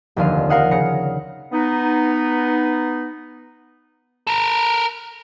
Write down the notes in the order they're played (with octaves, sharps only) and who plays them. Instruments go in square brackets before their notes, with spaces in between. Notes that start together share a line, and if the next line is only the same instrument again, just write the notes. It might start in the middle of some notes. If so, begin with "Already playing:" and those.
[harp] F1 D#2 D3 F5 D#7
A#4 F5 F#5 D#6
C#3 A#6 C#7
[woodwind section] B3 D#4
[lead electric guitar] A4 A#4